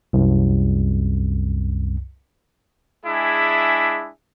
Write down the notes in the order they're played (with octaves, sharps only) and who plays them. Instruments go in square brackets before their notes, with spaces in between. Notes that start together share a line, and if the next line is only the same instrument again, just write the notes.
[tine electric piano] C2 F#2
[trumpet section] G#3 D4 E4 G#4 E5